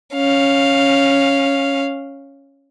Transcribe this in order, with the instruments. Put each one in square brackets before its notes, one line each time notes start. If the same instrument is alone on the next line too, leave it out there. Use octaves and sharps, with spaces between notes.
[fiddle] C#4 F5